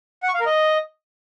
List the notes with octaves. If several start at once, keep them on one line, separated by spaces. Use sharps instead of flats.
F#5
C#6
F5
A#4
D#5